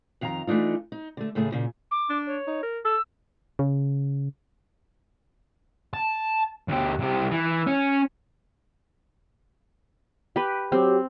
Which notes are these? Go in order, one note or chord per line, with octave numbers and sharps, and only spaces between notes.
F2 D#3 F5 G#5 A#5
E3 A3 D4 D#4 F4
D#4
D3 A3
D#2 A2 C#3 A3 G#4
A#2 C#3
D6
D4
C#5
D#4
A#4
A4 E6
C#3
A5
D2 G4
C2 G4
E3
C#4
G4 B4
F#3 C4 G4